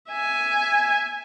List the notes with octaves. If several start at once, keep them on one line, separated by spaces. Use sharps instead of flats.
E5 G#5